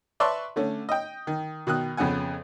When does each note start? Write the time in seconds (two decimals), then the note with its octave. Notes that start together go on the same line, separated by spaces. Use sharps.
0.20 B4 D5 E5 A5 C6 C#6
0.56 D3 A3 C#4
0.89 D#5 G5
1.27 D#3
1.67 B2 D#3 D#6 F#6
1.97 F2 C#3 B3 F#5 G#5